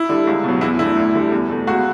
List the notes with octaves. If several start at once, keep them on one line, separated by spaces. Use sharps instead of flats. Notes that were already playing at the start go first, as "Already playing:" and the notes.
Already playing: E4
D3 G3
C#2
B2 F#3
E2 E4
D3 A3 E4
D2
D3 G3
E2
B2 A3
C#2 F#4